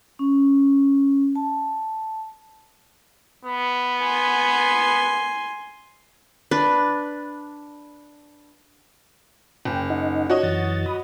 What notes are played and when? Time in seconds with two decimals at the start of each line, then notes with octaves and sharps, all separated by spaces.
0.19 C#4
1.36 A5
3.45 B3
4.03 G#5 C6
6.51 D4 B4
9.65 F#1 G5
9.90 D#4 D#5 F#5
10.30 F#4 C#5 D#5
10.43 F#2 E3 A6
10.86 B5 D#6